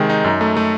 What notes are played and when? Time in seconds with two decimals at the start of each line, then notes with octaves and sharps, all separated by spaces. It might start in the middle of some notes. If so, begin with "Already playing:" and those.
Already playing: C3 D#3 G#3
0.10 D#4
0.24 F#2
0.41 A3
0.57 A3